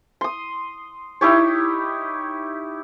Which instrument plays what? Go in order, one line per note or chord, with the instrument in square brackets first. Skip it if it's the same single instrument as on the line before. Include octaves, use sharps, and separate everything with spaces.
[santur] C6 D#6
D#4 E4 G4 C#5